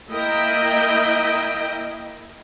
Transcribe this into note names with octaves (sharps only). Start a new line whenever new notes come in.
A#3 E4 A#4 D#5 E5 G5